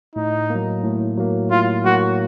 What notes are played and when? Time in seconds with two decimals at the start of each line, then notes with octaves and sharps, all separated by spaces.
0.15 A2 D#4
0.50 F#3 A#3
0.83 A2
1.17 F#3 A#3
1.51 A2 F4
1.86 F#3 A#3 F#4